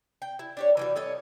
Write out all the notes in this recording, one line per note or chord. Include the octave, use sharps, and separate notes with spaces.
G5
E4
D4 G4 C#5
E3 G3 F#4
A4 C#5 D#5